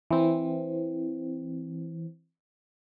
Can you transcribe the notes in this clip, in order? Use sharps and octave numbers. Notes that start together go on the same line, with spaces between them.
E3 C4